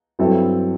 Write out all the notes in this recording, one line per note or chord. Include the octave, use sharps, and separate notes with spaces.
G2 F#3 C4 E4 A4